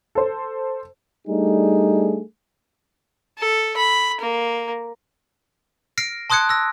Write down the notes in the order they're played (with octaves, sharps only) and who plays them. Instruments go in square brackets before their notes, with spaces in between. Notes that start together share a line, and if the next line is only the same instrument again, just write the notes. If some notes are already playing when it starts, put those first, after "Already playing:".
[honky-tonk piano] A4 C5
[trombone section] G3 A3 D4 D#4 G#4
[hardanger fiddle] A4
B5
A#3
[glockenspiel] F6 A#6 C7 D7
A5 C6 D#6 F#6 G#6 C#7
E6 A#6